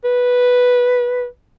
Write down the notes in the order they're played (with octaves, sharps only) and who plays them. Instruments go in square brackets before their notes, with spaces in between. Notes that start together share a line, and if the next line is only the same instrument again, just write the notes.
[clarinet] B4